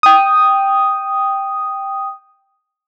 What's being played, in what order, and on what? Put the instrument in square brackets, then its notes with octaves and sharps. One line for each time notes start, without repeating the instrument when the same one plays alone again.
[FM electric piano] G5 D#6